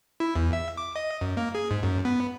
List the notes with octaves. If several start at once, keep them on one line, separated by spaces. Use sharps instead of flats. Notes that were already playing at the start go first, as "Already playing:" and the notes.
E4
E2
E5
D6
D#5
F#2
A#3
G#4
G#2
F#2
B3